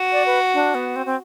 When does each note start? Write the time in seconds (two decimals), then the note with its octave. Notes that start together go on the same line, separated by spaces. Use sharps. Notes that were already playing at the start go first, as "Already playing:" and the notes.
Already playing: F#4
0.12 D5
0.26 B4
0.54 D4
0.75 B3
0.96 C4
1.06 C4